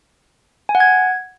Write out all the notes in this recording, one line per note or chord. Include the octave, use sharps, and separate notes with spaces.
G#5
F#5
G#6